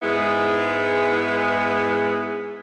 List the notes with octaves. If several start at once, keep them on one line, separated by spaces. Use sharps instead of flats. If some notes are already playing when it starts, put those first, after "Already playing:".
G#2 G#3 B3 E4 G#4